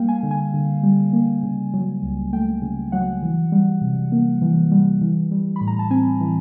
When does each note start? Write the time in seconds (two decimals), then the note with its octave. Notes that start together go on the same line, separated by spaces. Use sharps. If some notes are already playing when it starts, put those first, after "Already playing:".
Already playing: G3 A#3 F5 G5
0.09 G#5
0.23 D3
0.31 G#5
0.54 D3
0.83 G3
1.13 A#3
1.43 C#3
1.74 F#3
2.03 C#2
2.33 A3 G5
2.62 C#3
2.92 F#3 F#5
3.22 E3
3.52 G3
3.81 C3
4.12 A#3
4.42 E3
4.72 G3
5.02 E3
5.31 G3
5.56 A2 B5
5.68 A#5
5.79 A5
5.91 C4 G#5
6.21 E3